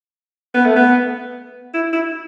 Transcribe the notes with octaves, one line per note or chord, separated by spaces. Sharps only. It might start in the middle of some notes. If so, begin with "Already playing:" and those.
B3
A3
B3
E4
E4